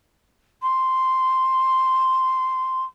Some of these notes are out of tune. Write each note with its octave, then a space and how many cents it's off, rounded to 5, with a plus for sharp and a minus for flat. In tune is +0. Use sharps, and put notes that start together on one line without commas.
C6 -5